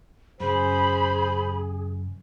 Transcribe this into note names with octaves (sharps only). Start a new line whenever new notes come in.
F#2 C#3 G#4 C5 B5